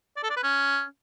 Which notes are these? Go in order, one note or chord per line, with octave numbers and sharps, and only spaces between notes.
D5
A4
D5
B4
C#4